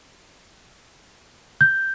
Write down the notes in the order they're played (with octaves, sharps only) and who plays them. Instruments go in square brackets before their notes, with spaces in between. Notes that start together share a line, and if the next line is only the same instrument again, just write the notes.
[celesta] G6